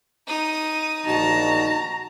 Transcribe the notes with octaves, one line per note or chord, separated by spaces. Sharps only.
D#4 D#6
A#1 D#4 F#4 A5 A#5